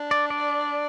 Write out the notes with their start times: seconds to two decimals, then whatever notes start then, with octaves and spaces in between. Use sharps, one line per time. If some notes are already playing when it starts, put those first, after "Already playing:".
Already playing: D4
0.11 D5
0.30 D5